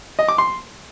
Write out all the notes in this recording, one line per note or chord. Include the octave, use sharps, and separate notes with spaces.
D#5
D6
C6